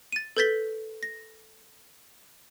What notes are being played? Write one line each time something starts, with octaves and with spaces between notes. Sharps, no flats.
A6 D#7
A4 B4 G6 A6 B6 G7
A#6